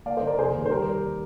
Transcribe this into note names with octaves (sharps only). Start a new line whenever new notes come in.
A#3 D5 F5
C5 D#5
D3
A#4 D5
F1 G#4 C5
D#2
C5
G3 G4 A#4